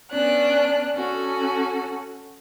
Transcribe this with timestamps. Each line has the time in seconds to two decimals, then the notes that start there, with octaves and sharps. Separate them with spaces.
0.12 B3 C#4 D4 F#6
0.96 C#4 F#4 A4